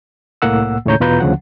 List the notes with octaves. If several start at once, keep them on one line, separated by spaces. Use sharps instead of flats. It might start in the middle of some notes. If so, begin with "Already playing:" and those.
C2 A2 A#3 F#5 E6
D#2 A2 C#3 C#5 A#5 G6
E2 B2 F4 B4 A#5 G6
D2 C#3 F3 F#5